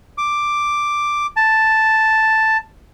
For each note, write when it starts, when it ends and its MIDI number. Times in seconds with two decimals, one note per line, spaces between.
0.18 1.26 86
1.36 2.57 81